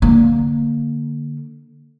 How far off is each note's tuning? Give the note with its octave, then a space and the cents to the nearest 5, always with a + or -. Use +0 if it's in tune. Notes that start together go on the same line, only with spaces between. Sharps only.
D3 +0 A#3 +0